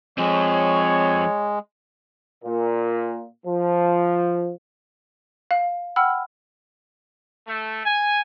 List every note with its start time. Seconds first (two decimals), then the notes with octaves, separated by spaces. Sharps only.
0.18 F3 G#3 C4 C#5
2.44 A#2
3.46 F3
5.51 F5
5.96 F#5 G5 B5 E6 F6
7.46 A3
7.84 G#5